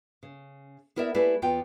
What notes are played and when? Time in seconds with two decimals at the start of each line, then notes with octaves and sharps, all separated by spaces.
0.23 C#3
0.96 B3 E4 A#4 D5 E5
1.14 A3 E4 G4 G#4 B4 D5
1.42 E2 B3 F4 G5